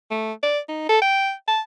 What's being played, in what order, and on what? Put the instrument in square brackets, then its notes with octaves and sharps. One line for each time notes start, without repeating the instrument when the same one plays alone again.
[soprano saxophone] A3
D5
D#4
A4
G5
A5